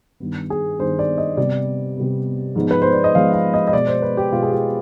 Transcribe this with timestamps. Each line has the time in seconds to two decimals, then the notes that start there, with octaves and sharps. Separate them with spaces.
0.20 G2 D#3 B3
0.50 G#4
0.79 G2 D#3 B3 C5
0.99 D5
1.18 D#5
1.37 C3 G3 B3 D5
1.97 C3 G3 B3
2.55 G#2 F3 G#3 B3
2.71 B4
2.82 C5
2.93 D5
3.04 D#5
3.14 G#2 F3 G#3 B3 F5
3.33 F5
3.54 D#5
3.68 D#5
3.73 B2 G#3 B3 D5
3.87 C5
4.02 B4
4.17 G4
4.32 B2 G#3 B3 F4
4.43 G#4
4.52 G4